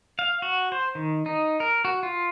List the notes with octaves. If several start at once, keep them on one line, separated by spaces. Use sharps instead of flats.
F5
F#4
C5
D#3
D#4
A#4
F#4
F4